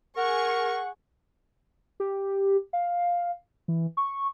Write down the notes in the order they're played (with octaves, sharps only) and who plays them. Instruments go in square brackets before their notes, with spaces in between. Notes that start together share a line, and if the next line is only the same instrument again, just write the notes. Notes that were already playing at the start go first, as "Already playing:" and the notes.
[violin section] G#4 C#6 [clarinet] A#4 [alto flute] F#5
[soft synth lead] G4
F5
E3
C#6